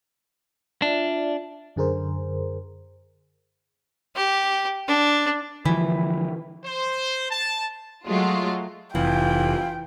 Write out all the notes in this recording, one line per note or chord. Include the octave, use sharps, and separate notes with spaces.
D4 F4 D5 E5
F#2 D3 G#4 A#4 C5
G4
D4
D3 E3 F3
C5
A5
F#3 G#3 A3 F4 F#4
F1 E3 E4 F4 G5